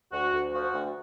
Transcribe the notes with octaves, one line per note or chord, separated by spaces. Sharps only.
D2 F#4
D2
F3 F#4
D2